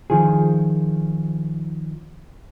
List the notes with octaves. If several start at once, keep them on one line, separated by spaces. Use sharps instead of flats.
D#3 F3 G#4